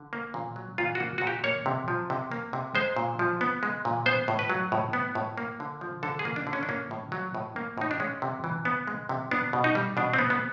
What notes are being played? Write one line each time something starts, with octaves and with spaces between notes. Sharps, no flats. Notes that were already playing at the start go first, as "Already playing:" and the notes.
Already playing: D3
A#3
A#2
F#3
A#2 F4
F#4
A#3
A#2 F#4
G4
A#3 C#5
C3
F3
C3
A#3
C3
G#3 C5
A#2
F3
B3
G#3
A#2
B3 C5
A2
B4
F#3
A2
B3
A2
A#3
D3
F3
D3 A4
G#4
A#3
D4
D3
C#4
D4
A#3 C#4
A2
F#3
A2
A#3
A2 D#4
D4
G#3 C#4
C3
E3
B3
G#3
C3
B3 D4
B2
D#4
G3
B2 D4
C4
B3
B3